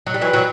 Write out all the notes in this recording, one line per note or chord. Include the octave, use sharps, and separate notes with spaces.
F#3
G3
E3 F#3
F#3